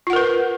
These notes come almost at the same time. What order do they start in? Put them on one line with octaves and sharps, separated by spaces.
F4 F#5 A#4 B4